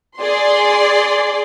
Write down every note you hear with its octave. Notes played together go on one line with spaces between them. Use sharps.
G#4 D5 C6